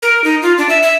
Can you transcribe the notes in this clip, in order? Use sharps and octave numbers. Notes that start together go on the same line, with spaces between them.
A#4
D#4
F4
D4
E5
E5